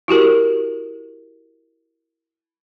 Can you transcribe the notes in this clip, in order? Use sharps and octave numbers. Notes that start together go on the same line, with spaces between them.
E4 F#4 G4 A#4